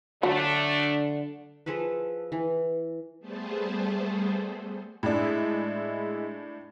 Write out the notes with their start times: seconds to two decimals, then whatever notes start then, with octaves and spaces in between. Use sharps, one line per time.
0.23 D3 F#3 A3 D4
1.66 F3 G#4 A4 B4
2.32 E3
3.20 G3 A3 B3 G#4 A4 C5
5.03 A2 G#3 D4 E4